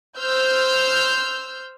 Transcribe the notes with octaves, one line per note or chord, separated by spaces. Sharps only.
C5 E6 F6 G6